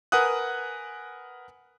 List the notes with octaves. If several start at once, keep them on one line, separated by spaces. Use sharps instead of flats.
A#4 B4 F#5 G#5 D#6 F#6